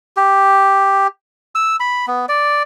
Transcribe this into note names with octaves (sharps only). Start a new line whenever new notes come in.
G4
E6
B5
B3
D5